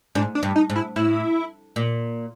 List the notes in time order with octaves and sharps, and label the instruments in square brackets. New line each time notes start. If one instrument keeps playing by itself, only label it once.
[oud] G#2 [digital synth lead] D4
[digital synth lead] D4
[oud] G2
[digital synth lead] D#4
[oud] G#2
[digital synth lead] E4
[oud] A2 [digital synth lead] E4
[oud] A#2